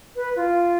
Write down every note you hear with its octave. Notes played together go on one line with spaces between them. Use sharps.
B4
F4